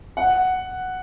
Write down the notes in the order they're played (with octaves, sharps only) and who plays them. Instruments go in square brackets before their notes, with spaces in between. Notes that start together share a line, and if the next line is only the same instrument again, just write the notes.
[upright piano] F#5